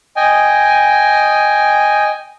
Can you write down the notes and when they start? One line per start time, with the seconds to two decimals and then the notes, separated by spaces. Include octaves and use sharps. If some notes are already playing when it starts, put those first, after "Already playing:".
0.16 D#5 G5 G#5